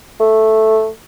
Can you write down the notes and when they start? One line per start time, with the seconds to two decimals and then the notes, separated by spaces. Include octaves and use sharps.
0.20 A3